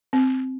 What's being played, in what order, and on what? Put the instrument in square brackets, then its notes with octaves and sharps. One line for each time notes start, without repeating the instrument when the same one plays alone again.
[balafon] C4